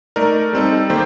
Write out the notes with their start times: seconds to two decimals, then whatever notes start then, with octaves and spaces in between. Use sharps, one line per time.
0.16 A3 D#4 A#4 D5
0.53 G3 C4 D#4 A4
0.90 D#3 A#3 G4 C5